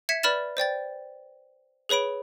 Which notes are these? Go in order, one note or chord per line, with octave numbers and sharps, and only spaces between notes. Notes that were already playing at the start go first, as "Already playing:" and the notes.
E5 G#6 B6 C#7 E7
B4 D5 B5 F6 A6 E7
C5 D5 G5 A6
G#4 B4 C#5 B5 D7